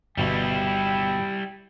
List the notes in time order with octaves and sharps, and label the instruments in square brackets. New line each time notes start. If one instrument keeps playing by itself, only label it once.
[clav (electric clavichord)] G1 B2 A5 [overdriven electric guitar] G3 E4 [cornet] G5